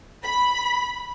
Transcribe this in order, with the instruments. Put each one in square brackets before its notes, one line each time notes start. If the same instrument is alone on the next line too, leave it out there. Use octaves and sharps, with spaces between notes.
[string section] B5